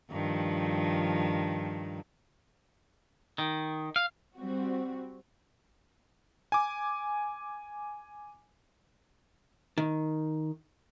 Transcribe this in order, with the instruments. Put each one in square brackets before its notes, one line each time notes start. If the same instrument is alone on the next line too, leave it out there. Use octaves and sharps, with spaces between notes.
[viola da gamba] G2 D#3 F3
[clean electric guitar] D#3
F5
[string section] G3 C4 F#4
[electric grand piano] G#5 D6
[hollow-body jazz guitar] D#3